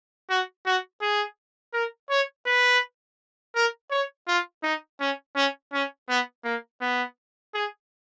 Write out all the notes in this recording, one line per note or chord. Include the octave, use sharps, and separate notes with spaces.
F#4
F#4
G#4
A#4
C#5
B4
A#4
C#5
F4
D#4
C#4
C#4
C#4
B3
A#3
B3
G#4